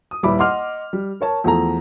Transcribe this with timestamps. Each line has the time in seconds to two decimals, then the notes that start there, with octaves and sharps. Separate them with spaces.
0.11 D#6
0.23 D#1 G3 E4 B4 B5 D6
0.39 D#5 F#5 C6 D6 F6
0.93 G3
1.21 A#4 C#5 A5
1.44 E2 F3 A3 A4 A#5